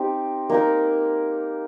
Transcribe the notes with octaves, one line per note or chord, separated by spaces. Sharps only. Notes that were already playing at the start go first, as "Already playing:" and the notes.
Already playing: C4 D#4 G4
A#3 D#4 A#4